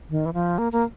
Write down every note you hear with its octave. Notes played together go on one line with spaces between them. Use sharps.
D#3
E3
F3
A#3
A#3